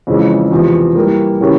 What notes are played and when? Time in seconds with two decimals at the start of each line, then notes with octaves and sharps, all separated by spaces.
0.07 F2 C#3 E3 G#3
0.51 E2 C3 F3
0.95 E3 G3 A#3
1.40 C#3 E3 A#3 C#4 G4